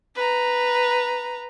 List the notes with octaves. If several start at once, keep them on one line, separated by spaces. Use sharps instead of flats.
B4 A#5